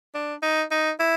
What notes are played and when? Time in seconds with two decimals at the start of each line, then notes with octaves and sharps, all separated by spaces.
0.14 D4
0.42 D#4
0.71 D#4
1.00 E4